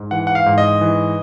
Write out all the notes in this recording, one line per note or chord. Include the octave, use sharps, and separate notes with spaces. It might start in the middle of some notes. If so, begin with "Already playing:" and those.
Already playing: G#2
E3 F#5
F#5
F5
G#2
D#5
E3